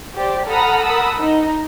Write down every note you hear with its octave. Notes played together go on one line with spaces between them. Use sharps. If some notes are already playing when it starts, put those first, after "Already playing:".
G4 C5 D5
A4 F#5 A#5 B5 D#6 F6
A#4 F#5 A5 B5 D#6 E6
D#4